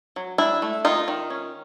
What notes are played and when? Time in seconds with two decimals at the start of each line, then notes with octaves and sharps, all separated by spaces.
0.16 F#3
0.38 D4 E4
0.62 A3
0.85 D#3 D#4 F4
1.08 D#3
1.30 C#4